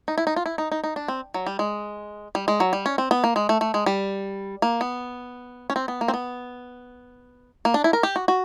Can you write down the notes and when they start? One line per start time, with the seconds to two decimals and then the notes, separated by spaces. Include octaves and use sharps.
0.08 D#4
0.18 E4
0.27 D#4
0.36 F4
0.46 E4
0.58 D#4
0.72 D#4
0.84 D#4
0.96 D4
1.08 C4
1.34 F#3
1.46 G3
1.59 G#3
2.35 G3
2.48 G#3
2.60 F#3
2.73 G3
2.86 C#4
2.98 C4
3.11 B3
3.24 A#3
3.36 G#3
3.49 A3
3.61 A3
3.74 G#3
3.86 G3
4.62 A#3
4.81 B3
5.70 C#4
5.76 C4
5.88 B3
6.01 A#3
6.08 C4
6.14 B3
7.65 A#3
7.74 D4
7.84 E4
7.93 A#4
8.03 G4
8.16 F#4
8.28 F#4